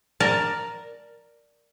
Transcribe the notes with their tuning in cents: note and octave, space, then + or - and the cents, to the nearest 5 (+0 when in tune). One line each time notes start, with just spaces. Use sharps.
A#4 +0 D5 +0 A5 +15